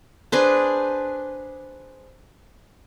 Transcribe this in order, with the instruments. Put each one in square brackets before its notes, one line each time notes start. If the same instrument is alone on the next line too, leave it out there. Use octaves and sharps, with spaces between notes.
[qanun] D4 G#4 B4 C5